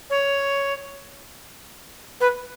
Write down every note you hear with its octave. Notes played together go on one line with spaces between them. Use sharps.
C#5
B4